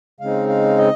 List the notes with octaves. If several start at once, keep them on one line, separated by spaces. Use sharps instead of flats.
C#3 G#3 C4 D#4 F5
F5
D#5